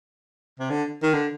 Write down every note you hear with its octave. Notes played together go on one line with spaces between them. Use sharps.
C3
D3
D#3
D3